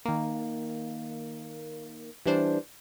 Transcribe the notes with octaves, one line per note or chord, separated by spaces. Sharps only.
D#3 A#3
E3 G3 D4 C5